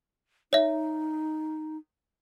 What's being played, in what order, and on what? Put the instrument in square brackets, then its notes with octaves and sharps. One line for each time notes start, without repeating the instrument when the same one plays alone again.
[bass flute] D#4 [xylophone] C#5 E5